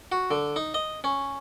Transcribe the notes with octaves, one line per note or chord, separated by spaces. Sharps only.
F#4
D3
D#4
D#5
C#4